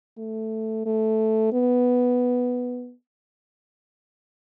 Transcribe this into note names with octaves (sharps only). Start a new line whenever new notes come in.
A3
A3
B3